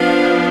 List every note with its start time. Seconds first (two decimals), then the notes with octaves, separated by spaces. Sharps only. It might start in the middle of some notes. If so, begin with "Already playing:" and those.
Already playing: F3 B3 D4 F5